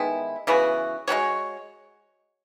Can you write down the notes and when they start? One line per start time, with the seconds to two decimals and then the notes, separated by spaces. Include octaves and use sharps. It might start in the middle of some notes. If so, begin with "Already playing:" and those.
Already playing: D#3 G#3 B3 E4
0.47 C#3 E3 B3 F#4
1.08 G#3 B3 F#4 C#5